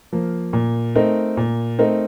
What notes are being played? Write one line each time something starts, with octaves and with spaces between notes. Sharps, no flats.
F3 A#3
A#2
A3 C4 D#4 A#4
A#2
A3 C4 D#4 A#4